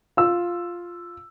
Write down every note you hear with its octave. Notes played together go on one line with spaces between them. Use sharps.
F4 E6